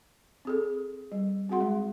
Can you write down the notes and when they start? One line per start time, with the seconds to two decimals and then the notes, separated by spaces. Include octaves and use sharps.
0.45 C4 G#4 A4
1.12 G3
1.49 C4 F#4 G#4 F#5 C6
1.61 G#3